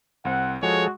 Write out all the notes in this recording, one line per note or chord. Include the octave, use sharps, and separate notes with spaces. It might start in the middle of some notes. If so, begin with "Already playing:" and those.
C2 C4 C5 F#5
F3 G#3 F#4 G#4 A4 C#5